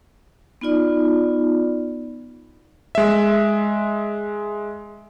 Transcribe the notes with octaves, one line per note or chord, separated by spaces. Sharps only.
B3 D#4 F4 D5
G#3 E5